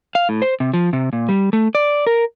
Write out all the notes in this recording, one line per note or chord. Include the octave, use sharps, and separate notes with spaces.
F5
A2
C5
C3
F3
C3
A#2
G3
A3
D5
A#4